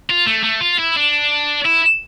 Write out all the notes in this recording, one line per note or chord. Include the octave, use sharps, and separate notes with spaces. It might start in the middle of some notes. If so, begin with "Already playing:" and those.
F4
A3
A3
F4
E4
D4
E4